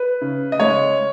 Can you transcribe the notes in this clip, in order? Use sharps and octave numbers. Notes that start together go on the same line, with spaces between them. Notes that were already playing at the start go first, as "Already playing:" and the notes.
Already playing: B4
C#3
D#5
G#3 C#5